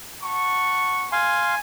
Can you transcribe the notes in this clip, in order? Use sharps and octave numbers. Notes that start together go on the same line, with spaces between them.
F#5 A5 C#6
F5 G#5 C6